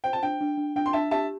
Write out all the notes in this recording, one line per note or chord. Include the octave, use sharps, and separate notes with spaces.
C5 G5
A5
D4 G5
D4
D4
D4 G5
C6
D4 E5 A5
G4 E5 A5